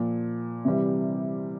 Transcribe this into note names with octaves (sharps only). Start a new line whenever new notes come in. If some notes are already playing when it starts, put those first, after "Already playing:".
Already playing: A#2 F3
C3 E3 G3